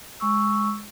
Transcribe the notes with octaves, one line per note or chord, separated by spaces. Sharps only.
G#3 C#6 E6